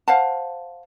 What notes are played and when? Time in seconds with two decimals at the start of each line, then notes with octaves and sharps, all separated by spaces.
0.08 C5 F5 F#5 A5